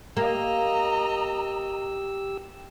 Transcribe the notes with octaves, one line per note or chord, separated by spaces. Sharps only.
A#3 G4 D#5 A#5 E6